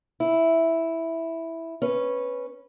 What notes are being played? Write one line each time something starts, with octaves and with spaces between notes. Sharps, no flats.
E4
C#4 B4